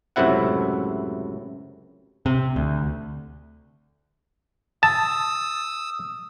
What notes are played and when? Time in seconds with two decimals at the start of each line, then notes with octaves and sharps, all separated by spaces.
0.16 C#2 F#2 A2 C3 E4 F#5
2.26 C3
2.56 D2
4.83 A5 D#6 E6